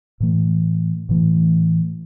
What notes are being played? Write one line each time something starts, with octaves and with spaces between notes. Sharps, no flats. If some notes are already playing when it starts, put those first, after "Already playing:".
A2 E3 A3
A2 E3 A3